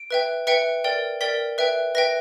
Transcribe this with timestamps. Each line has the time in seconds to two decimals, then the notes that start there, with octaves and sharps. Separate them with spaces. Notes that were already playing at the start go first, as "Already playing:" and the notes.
Already playing: D7
0.11 B4 E5 G5
0.47 B4 E5 G5 C#7
0.84 A#4 D5 G5
1.21 A#4 D5 G5 B6
1.58 B4 E5 G5
1.95 B4 E5 G5 A#6